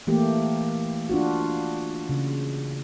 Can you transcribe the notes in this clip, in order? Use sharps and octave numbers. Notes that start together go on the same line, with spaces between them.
E3 A3 A#3 G4
D4 F4 F#4
C#3